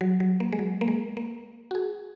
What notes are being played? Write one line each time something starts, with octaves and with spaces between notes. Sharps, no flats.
F#3
F#3
A#3
G#3
F#3
A#3
G#3
A#3
F#4
G#4